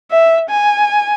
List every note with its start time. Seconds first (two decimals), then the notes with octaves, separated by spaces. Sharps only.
0.11 E5
0.50 G#5